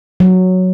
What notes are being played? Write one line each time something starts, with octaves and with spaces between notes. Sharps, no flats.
F#3